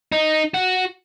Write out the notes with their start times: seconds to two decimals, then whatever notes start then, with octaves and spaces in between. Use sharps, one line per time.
0.12 D#4
0.54 F#4